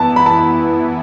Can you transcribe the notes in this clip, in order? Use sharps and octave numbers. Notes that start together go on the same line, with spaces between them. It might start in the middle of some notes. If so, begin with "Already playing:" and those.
Already playing: E3 B3 E4 A5
B5
A5